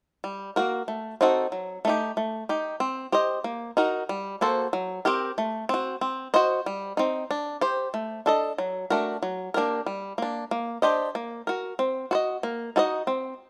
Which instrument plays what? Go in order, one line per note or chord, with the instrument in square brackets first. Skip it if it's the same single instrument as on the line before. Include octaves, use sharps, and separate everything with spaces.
[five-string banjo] G3
A#3 F#4 A#4
A3
C4 D#4 F#4 A4
F#3
A3 D#4 G4
A3
D#4 G4
C4
G4 C5 D#5
A#3
D#4 F#4 A#4
G3
A#3 F#4 A4 C5
F#3
C4 G4 A#4
A3
C4 F#4
C4
F#4 C5 D#5
G3
C4 D#4
D4
G4 C5
A3
D4 A4 D#5
F#3
A3 D4 F#4 A#4
F#3
A#3 D4 G4 A#4
G3
A#3 D4
A#3
D4 G4 C5 D#5
A#3
F#4 A#4
C4
F#4 C5 D#5
A#3
D#4 F#4 A4 D#5
C4